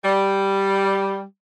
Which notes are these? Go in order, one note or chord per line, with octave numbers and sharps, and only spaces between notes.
G3